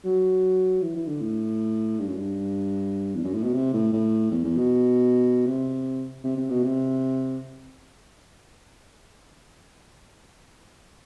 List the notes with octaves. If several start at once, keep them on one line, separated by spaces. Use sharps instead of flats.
F#3
E3
E3
D3
A2
G2
F#2
G2
E2
F#2
A2
B2
C3
A2
A2
E2
E2
B2
C3
C3
C3
B2
C3